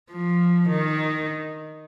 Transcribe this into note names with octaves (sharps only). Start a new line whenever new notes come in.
F3
D#3